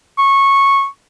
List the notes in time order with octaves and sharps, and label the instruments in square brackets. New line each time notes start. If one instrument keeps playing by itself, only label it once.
[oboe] C#6